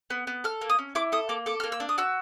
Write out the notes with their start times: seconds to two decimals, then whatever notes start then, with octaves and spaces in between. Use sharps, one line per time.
0.10 B3
0.27 B3
0.44 A4 F6
0.61 A#3
0.70 D#6
0.79 C#4
0.95 E4 D6
1.12 A4 D#6
1.29 A#3 D6
1.46 A4 D6
1.60 A#3 F6
1.72 E6
1.80 D4
1.89 D#6
1.98 F#4 E6